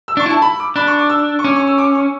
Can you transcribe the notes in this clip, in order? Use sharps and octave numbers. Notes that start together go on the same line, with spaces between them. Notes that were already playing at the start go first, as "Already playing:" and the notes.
E6
D4 C#6
E4
A5
B5
D6
D4 B5
C#6
D6
E6
C#6
C#4 D6
C#6
E6
D6
C#6